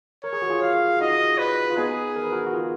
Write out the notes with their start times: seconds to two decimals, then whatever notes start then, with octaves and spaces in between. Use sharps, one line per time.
0.24 A#4 C#5
0.33 G#4
0.42 F#4
0.50 F4 G#4
0.63 F5
1.00 D#4 F#4 D#5
1.39 B4
1.70 F4
1.77 B3 D#4 G#4
2.16 A#4
2.24 B4
2.32 F#4 A#4
2.47 F#4
2.53 F4 G#4